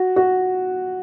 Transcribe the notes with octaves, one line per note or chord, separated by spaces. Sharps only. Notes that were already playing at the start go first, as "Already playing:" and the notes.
Already playing: F#4
F#4